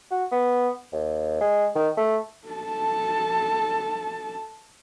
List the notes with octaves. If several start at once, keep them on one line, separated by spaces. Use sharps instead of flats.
F#4
B3
D#2
G#3
D#3
A3
A4 A5